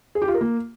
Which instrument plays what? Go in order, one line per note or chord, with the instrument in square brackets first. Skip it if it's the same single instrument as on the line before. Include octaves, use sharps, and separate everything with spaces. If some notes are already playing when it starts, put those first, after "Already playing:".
[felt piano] G#4
G4
F4
A#4
A#3